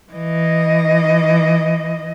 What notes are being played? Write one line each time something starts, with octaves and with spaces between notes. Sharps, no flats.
E3 D#5